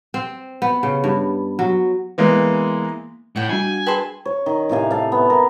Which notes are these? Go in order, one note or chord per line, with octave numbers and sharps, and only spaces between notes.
C4
B3
C#3
G2
F#3
E3 G#3 A#3 B3
A2 F#5 G5
G3 D4 F#4 G#5
G#4 B4 G5 A5 C6
C#5
D#3
A2 C3 F5 G#5
A4 F5
B3
A#4